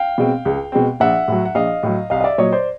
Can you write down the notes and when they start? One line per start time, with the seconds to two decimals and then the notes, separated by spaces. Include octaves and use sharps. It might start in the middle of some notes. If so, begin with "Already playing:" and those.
Already playing: F5 G5
0.18 B2 G#3 C4
0.45 C#2
0.72 B2 G#3 C4
1.00 A#1 E5 F#5
1.28 A2 F#3
1.45 F#5
1.55 A#1 D#5 F5
1.83 A2 F#3
2.10 C2 D#5 F5
2.20 D#5
2.24 D5 E5
2.38 A#2 F#3 C#5 D#5
2.52 C5 D5